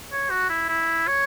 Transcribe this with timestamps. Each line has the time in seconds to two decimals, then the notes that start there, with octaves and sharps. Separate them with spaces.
0.12 C#5
0.30 F#4
0.50 E4
0.69 E4
1.08 C#5